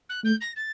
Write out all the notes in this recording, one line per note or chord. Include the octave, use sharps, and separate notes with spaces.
F#6
A3 G6
A#6
A6